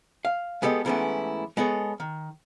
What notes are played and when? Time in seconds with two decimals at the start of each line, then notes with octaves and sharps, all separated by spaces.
0.25 F5
0.62 G#3 B3 G4 A4 D#5
0.85 G#2 E3 A3 B3 C#4 E4
1.57 G#3 B3 A4 C#5
2.00 D#3